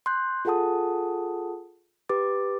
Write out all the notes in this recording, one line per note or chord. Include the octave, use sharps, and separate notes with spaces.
C6 F#6 G6
F4 G#4 A4 F#5 A5 D#6
G4 B4 D6 A6